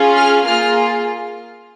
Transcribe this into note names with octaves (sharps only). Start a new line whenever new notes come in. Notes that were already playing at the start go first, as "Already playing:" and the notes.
Already playing: C#4 F4 G#4
F6
A#3 F4 G#4 F6